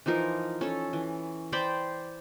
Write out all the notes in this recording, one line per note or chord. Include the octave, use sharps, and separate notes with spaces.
E3 F3 D#4 A#4
C#4 A4
E3
C5 D5 G5 B5